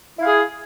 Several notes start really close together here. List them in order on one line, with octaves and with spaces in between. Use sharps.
E4 F5 G#4